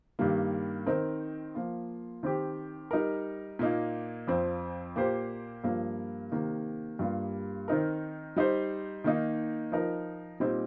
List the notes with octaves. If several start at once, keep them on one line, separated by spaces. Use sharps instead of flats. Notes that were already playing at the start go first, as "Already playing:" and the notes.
G2 D#3 G3 A#3
D#3 C4 D#4 A#4
F3 A#3 F4
D#3 C4 G4
G3 D#4 A#4
A#2 A#3 D#4
F2 F3 C4
A#2 A#3 G4 C5
G2 F3 A#3
C3 D#3 A#3
G2 G3 A#3 F4
D#3 C4 D#4 A#4
G3 D#4 C5
D#3 A#3 D#4
F3 D#4 A#4
A#2 G3 C4 D#4